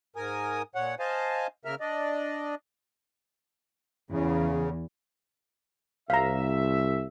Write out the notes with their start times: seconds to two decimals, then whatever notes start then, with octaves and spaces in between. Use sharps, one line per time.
0.16 G#2 A#4 G#5 D#6
0.75 A#2 C#5 F#5
0.99 C5 D#5 F5 G#5 A5
1.65 C#3 A#3 A#4 E5 F6
1.80 D4 D5 D#5
4.11 E2 C#3
6.10 C2 E5 F5 A#5